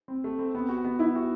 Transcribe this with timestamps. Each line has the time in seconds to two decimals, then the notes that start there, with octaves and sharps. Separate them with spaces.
0.08 C4
0.24 A3
0.39 C4
0.55 B3
0.69 F#4
0.85 B3
0.99 B3 E4
1.16 F#4